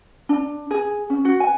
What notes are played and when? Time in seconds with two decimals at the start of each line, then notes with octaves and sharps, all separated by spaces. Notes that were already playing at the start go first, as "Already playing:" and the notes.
0.29 D4
0.71 G#4
1.10 C#4
1.25 F#4
1.40 G#5